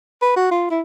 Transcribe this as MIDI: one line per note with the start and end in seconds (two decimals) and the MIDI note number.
0.22 0.32 71
0.36 0.51 66
0.51 0.66 65
0.71 0.81 64